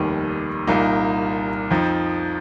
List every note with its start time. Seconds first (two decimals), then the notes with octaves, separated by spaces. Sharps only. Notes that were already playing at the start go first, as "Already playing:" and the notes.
Already playing: F1 D#2 D#3 G3
0.67 C2 A#2 A#3 D#4
1.70 F2 F3 D#4